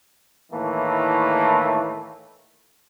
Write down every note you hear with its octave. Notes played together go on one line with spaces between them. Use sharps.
A2 D#3 E3 A3 A#3